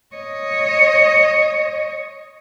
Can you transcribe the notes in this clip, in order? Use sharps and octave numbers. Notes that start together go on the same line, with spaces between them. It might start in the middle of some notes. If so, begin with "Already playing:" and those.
C#5 D#5